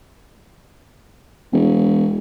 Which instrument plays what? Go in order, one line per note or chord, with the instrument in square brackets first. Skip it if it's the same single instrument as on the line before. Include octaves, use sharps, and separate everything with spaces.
[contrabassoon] E1